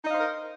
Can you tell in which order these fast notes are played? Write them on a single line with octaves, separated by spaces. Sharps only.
D#4 D#5 F5 C5 A#4